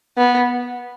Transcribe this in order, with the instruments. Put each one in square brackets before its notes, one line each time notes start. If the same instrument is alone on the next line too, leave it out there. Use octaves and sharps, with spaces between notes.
[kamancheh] B3